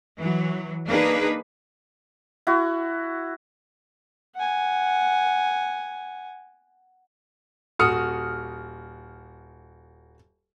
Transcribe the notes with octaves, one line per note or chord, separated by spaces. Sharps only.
E3 F#3
A#3 D4 D#4 G#4 B4
E4 F#4
F#5 G#5
D#1 F#4 D#6 F6 C#7